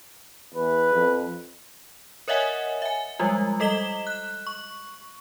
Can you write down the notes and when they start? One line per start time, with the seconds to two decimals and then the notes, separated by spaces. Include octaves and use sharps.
0.54 E2 B4
0.93 F2
2.28 A#4 C#5 D#5 E5 F#5 G#5
2.82 E5 G#5
3.19 F3 G3 G#3 F4
3.60 G3 A4 D#5 B6 E7 G7
4.07 F#6
4.47 C#6